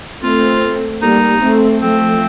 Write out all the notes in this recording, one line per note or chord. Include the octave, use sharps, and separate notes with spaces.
A3 C4 F4
G3 A#3 D#4
A3 C4
F3 A3 C4